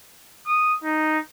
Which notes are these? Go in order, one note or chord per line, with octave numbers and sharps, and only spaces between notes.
D#6
D#4